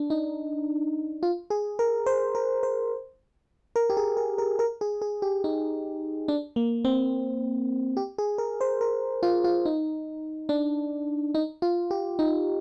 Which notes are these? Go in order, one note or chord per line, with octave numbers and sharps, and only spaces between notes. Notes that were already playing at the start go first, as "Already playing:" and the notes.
Already playing: D4
D#4
F4
G#4
A#4
C5
A#4
C5
A#4
G4
G#4
A#4
A#4
A#4
G#4
G#4
G4
D#4
D4
A#3
C4
G4
G#4
A#4
C5
A#4
F4
F4
D#4
D4
D#4
F4
G4
D#4